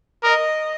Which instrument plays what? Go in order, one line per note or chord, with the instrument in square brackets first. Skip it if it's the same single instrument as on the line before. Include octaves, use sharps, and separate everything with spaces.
[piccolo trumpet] A#4 [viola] D#5